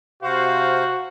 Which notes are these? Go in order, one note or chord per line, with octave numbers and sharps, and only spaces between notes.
C3 F#4 C5 F5